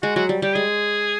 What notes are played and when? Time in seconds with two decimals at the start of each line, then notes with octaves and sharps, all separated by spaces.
0.03 G#3 F#4
0.16 F#3 F#4
0.29 G3
0.42 G3 G4
0.55 G#3 G#4